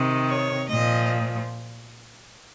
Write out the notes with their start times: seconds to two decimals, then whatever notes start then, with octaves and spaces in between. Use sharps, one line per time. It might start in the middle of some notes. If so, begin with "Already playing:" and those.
Already playing: C3 D#3
0.29 C#5
0.70 A#2 F3 D#5